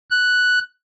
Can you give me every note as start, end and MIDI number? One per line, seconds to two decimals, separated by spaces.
0.11 0.59 90